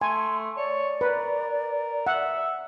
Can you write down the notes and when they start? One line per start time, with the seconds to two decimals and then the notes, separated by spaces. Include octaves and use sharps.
0.01 A3 G#5 C6
0.57 C#5 D5
1.01 A#4 B4
2.07 E5 F#5